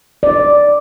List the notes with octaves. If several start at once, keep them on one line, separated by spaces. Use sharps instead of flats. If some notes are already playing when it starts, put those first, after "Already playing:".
D5